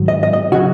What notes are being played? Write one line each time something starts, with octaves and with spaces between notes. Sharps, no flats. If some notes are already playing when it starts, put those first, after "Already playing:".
Already playing: G#2 D#3 F#3
D#5
D#5
D#5
C#3 F#3 C#4 F#4